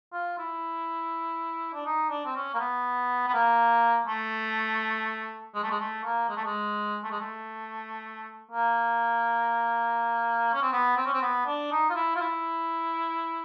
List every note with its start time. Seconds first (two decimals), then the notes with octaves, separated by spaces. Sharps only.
0.13 F4
0.38 E4
1.73 D4
1.86 D#4
2.10 D4
2.25 C4
2.35 C#4
2.54 A#3
2.59 B3
3.27 B3
3.33 A#3
4.07 A3
5.55 G#3
5.63 A3
5.71 G#3
5.79 A3
6.04 A#3
6.29 G#3
6.36 A3
6.44 G#3
7.03 A3
7.11 G#3
7.20 A3
8.51 A#3
10.53 C#4
10.62 C4
10.72 B3
10.97 C4
11.06 C#4
11.13 C4
11.22 B3
11.46 D4
11.72 D#4
11.90 F4
11.95 E4
12.16 F4
12.21 E4